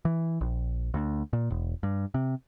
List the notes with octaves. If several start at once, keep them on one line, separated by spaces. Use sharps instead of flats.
E3
A#1
D2
A#2
E1
G2
C3